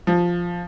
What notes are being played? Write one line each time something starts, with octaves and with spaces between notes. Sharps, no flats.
F3